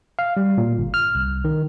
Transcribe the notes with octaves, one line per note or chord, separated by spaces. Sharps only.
F5
G3
A#2
G1
F6
C2
D#3